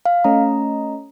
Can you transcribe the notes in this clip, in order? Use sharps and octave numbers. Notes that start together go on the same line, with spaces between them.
F5
A3 C#4 D#5 A#5